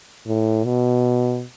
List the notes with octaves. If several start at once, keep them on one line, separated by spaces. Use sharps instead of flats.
A2
B2